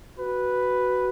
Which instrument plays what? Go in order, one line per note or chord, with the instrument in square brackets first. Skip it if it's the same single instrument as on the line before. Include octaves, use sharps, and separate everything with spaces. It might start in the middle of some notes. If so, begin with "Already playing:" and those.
[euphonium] F#4 [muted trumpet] B4